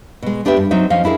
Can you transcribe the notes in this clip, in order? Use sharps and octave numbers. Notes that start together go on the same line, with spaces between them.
B2 G#3
B3 D4 G4 B4 E5
G2
F#3 C4 D#4 E5
F3 C#4 D#5 F5
D4 E4 G#4 A#4